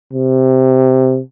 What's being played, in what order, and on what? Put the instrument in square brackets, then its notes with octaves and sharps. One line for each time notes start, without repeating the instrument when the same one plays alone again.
[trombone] C3